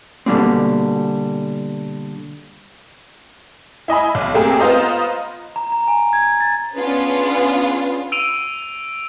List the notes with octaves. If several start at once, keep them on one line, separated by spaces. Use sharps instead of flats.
B2 D3 F3 G3 A#3 C4
E4 D#5 G#5 B5
B1
A3 A#3 C4 G4 G#4 A#4
B3 F4 C5 D#5 A#5
A#5
A#5
G#5
G#6
A6
B3 C#4 D4 F4 G#4 B4
E6 D7 D#7 F7